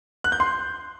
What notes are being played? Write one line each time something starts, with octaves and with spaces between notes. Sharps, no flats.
F#6
G6
C6